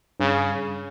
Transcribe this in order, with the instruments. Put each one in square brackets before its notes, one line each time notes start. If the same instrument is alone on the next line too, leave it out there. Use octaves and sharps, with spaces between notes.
[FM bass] G2 [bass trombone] C#3